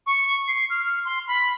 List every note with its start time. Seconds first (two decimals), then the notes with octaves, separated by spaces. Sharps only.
0.06 C#6
0.48 C7
0.70 F6
1.05 C6
1.27 B5